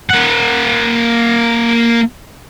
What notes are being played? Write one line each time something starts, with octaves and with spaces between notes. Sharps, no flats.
A#3 F#5